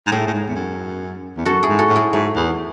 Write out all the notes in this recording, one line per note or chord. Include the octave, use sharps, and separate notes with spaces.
G#2
A2 E4 G#4
A2
G#2
E2
F#2
E2
F#2 F#4 A4
E4 G#4
G#2
F#4 A4
A2
E4 G#4
G#2 F#3 A3
E2